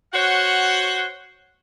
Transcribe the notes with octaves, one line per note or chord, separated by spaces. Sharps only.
F#4 C5 C#5 F#5